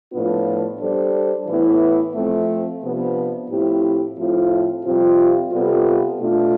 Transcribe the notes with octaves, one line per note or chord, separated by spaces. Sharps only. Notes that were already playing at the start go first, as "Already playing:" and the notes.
A2 F3 B3 D4 F4
G3 D4 A4 C5
A2 E3 B3 E4
F3 A3 C4
C3 F3 B3 D4
A2 F3 C4 E4 G4
A2 F3 C4 F4
F2 C3 G3 C4 F4
C3 G3 B3 F4 A4
B2 A3 D4 F4